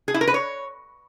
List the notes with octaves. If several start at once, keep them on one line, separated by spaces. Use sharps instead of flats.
G#4
E4
A#4
B4
C#5